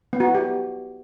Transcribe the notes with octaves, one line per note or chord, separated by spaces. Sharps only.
B3
F#4
E4
G4